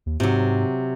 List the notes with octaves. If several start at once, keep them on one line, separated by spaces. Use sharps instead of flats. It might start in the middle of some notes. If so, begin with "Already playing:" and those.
D#2
G#2 C3 F#3